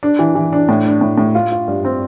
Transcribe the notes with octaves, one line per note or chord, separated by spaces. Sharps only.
D4
E3
E3
D4
A2
D4
A2
A2
F4
F4
G2
C4